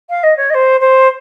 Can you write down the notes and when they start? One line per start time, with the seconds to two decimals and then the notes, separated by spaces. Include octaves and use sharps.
0.10 F5
0.23 D#5
0.37 C#5
0.50 D#5
0.54 C5
0.80 C5